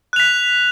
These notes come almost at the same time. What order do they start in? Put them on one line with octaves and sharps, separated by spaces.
F#6 F7 B6